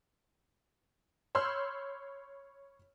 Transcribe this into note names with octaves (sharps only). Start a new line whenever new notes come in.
C#5 B5 C6 E6 F6 G6